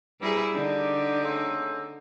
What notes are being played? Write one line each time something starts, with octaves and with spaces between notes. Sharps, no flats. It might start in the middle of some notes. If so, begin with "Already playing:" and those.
C2 G2 G3 E4 G#4 A#5
D3 D4 D#4 G4
C#3 A3 C4